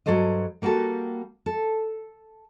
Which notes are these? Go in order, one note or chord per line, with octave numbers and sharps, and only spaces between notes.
G2 E3 F#3 A4 C5 D#5
G3 A#3 F#4 G4 A4
A4